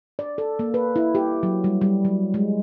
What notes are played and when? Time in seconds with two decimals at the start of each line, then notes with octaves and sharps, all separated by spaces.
0.19 D5
0.38 A4
0.59 A#3
0.74 B4
0.96 E4
1.15 G4
1.43 F#3
1.64 G3
1.81 G3
2.05 F#3
2.34 G#3